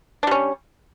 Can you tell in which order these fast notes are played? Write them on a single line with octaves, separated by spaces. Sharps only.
D4 G3 C#4